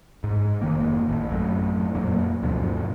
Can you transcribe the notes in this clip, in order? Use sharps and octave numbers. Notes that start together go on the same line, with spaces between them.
G#2
F1 D#3 A#3
A1
F#2 A2
F2 A#2 F#3 A#3
D2 G2 B2 F3